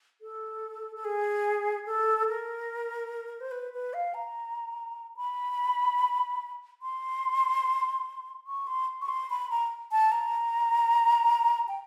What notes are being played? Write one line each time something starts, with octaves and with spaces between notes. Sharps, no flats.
A4
A4
G#4
A4
A#4
C5
B4
B4
F5
A#5
B5
C6
C#6
C6
C#6
C6
B5
A#5
A5
A#5
G5